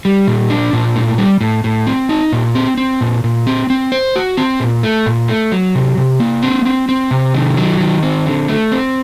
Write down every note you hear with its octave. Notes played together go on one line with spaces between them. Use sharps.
G3
A#2
D4
A#2
A2
G3
A2
A2
C4
D#4
A#2
C4
C4
A#2
A#2
C4
C4
C5
F#4
C4
A#2
A3
A#2
A3
F#3
C3
C3
A#3
C4
C4
C4
C3
D#3
F#3
D#3
C4
D3
A3
C4